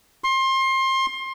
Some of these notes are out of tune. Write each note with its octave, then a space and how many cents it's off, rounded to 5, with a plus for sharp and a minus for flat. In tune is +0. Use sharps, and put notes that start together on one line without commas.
C6 +25